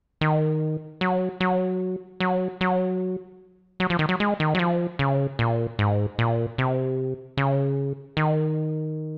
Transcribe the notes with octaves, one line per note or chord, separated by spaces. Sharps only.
D#3
F#3
F#3
F#3
F#3
F#3
F3
D#3
F#3
G#3
D#3
F#3
F3
C#3
A#2
G#2
A#2
C3
C#3
D#3